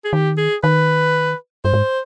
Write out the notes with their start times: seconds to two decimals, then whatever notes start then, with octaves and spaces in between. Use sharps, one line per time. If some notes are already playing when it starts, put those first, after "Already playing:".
0.05 G#4
0.13 D#3 G4
0.37 G#4
0.63 D#3 B4
1.64 G2 C5
1.73 G#2